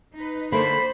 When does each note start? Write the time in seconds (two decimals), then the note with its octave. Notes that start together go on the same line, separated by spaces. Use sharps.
0.15 D#4 B4
0.52 D3 A3 A#3 D4 A#4 C5 B5